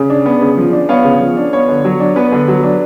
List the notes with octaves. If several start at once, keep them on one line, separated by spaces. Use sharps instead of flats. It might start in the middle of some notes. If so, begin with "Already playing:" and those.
Already playing: C#3
D4
B3
C#3
F3
D4
B3 C#5 F5
C#3
F3
D4
B3 C#5
D3
F#3
D4
B3 B4
D3
F#3
D4